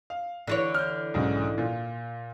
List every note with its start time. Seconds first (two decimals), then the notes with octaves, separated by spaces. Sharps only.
0.10 F5
0.47 D3 E3 C#5
0.74 F6 G6
1.14 B1 G#2 C#3
1.58 A#2 F4